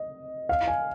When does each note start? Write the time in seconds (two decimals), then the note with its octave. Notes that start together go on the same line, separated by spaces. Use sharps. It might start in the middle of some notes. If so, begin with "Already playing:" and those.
Already playing: D#5
0.49 F5
0.68 G#5